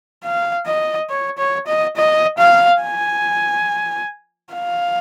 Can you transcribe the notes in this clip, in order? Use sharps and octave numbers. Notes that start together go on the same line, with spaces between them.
F5
D#5
C#5
C#5
D#5
D#5
F5
G#5
F5